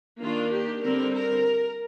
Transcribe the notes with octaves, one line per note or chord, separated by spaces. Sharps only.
D#3 A#3 D4 F4
G4
D3 G3 C4 A#4
A#4